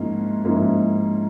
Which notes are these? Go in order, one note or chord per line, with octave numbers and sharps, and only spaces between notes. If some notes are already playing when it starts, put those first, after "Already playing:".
Already playing: G#2 F3 A#3 C#4 E4
G#2 F3 A#3 C#4 E4